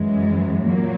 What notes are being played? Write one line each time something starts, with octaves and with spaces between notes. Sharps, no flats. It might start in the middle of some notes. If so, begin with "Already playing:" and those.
Already playing: F#2 E3 G#3
A#2 F#3 A#3